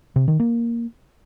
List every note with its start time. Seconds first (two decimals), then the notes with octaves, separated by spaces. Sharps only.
0.16 C3
0.28 D#3
0.40 A#3